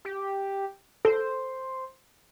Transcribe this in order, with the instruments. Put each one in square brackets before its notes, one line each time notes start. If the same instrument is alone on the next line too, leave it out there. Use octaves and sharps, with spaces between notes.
[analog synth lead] G4
[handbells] A4 [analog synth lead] C5